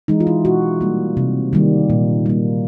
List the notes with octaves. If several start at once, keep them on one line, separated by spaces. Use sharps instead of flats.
E3 G#3 D#4
F4
E4
B2 F#4
G3 A#3
C3
D#3 G3 A#3
A#2
G3 A#3